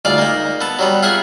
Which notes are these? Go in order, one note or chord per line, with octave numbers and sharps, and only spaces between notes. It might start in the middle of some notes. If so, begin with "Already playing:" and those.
D2 G#2 F4 D5
A#3 D#4
B3 A4
F#3 G3 B3
F4 G#4 E5 F#5